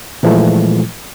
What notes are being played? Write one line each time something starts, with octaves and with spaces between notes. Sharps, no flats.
A#2 E3 F3 G#3 A3